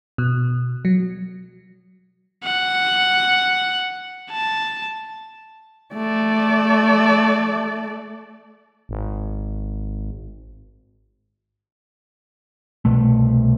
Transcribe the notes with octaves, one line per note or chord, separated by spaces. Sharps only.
B2
F#3
F#5
A5
A3 D5
G#1
C2 B2 A3